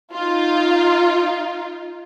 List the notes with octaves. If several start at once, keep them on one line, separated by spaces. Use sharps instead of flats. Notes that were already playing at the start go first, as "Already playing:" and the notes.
D#4 F4